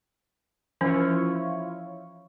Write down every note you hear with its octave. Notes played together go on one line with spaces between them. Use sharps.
E3 F3 C#4 E4 F4 C#5